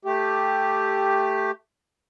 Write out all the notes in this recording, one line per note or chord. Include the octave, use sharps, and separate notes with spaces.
A3 G4